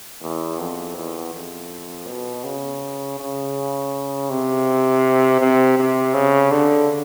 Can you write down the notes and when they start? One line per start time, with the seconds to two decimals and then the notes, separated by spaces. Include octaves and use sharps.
0.22 E2
0.59 F2
0.96 E2
1.34 F2
2.07 B2
2.44 C#3
3.19 C#3
4.30 C3
5.40 C3
5.78 C3
6.14 C#3
6.51 D3